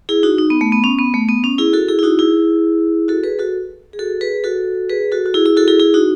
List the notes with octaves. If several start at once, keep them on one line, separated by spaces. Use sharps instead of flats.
E4 G#4
D#4 F#4
D#4
B3
A3
B3
C#4
B3
A3
B3
C#4
E4 G#4
F#4 A4
E4 G#4
E4
D#4 F#4
E4 G#4
F#4 A4
G#4 B4
F#4 A4
G#4
F#4 A4
G#4 B4
F#4 A4
G#4 B4
F#4 A4
F#4
E4 G#4
E4 G#4
F#4 A4
E4 G#4
E4 G#4
D#4 F#4